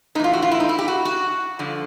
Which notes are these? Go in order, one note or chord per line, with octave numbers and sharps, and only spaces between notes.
A2 E3 D#4 F4
F#4
F4
E4
D#4
E4
G4
F#4
F#4
G2 D3 F3